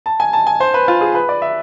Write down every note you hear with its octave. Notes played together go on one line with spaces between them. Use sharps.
A5
G#5
A5
G#5
C5
B4
F4
G#4
B4
D5
E5